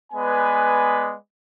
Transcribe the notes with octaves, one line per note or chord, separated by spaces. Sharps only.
G#3 B3 B4 D5 G#5